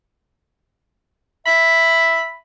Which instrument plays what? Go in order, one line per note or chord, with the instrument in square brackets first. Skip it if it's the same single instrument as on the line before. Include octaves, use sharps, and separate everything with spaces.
[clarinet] E5 [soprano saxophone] B5